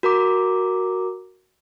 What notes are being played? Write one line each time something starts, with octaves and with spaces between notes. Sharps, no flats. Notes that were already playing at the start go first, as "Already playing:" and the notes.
F#4 A#4 A#5 D6